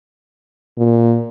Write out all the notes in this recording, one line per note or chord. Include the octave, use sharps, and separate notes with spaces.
A#2